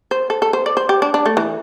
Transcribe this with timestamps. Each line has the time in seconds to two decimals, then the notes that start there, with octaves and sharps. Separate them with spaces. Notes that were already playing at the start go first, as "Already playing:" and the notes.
0.11 C5
0.30 A4
0.42 A4
0.53 C5
0.66 D5
0.77 C5
0.89 G4
1.02 D4
1.14 D4
1.26 A3
1.37 E3